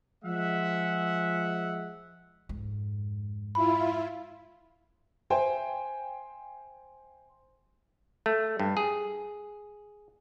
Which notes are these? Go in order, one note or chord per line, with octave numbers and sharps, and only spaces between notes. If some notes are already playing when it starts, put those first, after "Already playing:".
F3 G#3 E5 F#5
F2 G#2
E4 F4 B5
C5 E5 G5 G#5
A3
G2
G#4